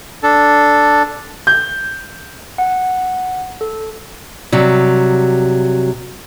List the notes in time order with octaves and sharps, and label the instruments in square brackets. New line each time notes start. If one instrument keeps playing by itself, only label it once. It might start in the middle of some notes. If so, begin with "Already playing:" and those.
[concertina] D4 A4
[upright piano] G6
[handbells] F#5
A4
[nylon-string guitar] C3 F#3 G3